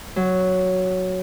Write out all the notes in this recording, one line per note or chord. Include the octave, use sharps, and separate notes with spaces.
F#3